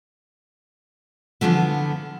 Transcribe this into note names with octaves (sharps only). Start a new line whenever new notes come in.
D3 E3 F3 A3 B3